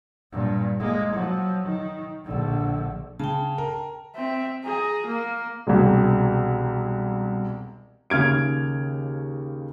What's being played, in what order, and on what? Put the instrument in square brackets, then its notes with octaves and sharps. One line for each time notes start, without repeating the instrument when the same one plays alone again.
[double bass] G2 A#2
G#3 A#3
F3 F#3
D#3
A#1 D3
[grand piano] C#3 [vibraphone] G5 A5
[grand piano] A#4
[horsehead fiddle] C4 E5
G#4 A#5
A#3
[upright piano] E1 C2
[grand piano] D#2 C#3 F6 G#6 D7